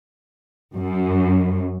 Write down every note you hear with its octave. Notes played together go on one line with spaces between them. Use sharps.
F#2